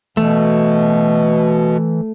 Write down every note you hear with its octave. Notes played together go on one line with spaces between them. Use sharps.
B2 E3 A3